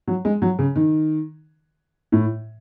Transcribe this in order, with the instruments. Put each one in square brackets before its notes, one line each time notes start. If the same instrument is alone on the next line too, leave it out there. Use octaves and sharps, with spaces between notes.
[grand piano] F#3
G#3
F#3
C#3
D#3
A2